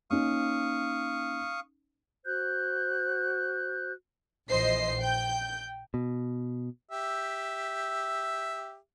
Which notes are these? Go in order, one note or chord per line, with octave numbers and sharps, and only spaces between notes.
A#3 C#4 D#4 F5 C#6 D#6
F#4 C5 F#6 G6
A#1 E3 C5 D#5 C7
G5 G6
B2
G4 E5